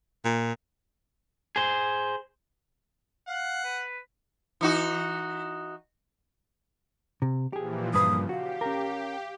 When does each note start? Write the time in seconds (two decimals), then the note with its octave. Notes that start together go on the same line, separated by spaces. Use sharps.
0.25 A#2
1.56 G#4 C5
3.28 F5 F#5
3.64 B4
4.61 E3 D#4 F#4
7.22 C3
7.53 A#2 E3 F3 G4 G#4
7.94 G2 A#2 C#3 F3 B4 D#6
8.29 F#4 G4 F5
8.61 C#4 A#4